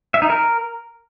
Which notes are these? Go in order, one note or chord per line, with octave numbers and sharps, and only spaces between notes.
E5
D#4
A#4